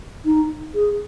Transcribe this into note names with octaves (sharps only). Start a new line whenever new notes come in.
D#4
G#4